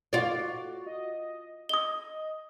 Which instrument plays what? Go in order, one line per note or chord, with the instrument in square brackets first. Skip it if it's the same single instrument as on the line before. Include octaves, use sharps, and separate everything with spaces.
[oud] F4 D5 [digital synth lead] F#4
[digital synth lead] D#5
[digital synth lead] D#5 [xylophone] D#6 G7